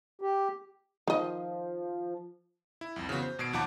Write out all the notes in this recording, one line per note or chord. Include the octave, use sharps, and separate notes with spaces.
G4
D#3 F3 D#5
E4
C2 F2
C#3 E3 F3 B3 F#4
C5
G#1 B2 G#6 C7 D7
D#2 F3 D#4 F#5 A5 D6